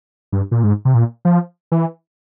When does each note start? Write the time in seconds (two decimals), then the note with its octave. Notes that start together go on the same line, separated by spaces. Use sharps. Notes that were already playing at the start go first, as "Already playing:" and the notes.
0.32 G2
0.51 A#2
0.64 G#2
0.85 C3
0.94 A#2
1.25 F3
1.72 E3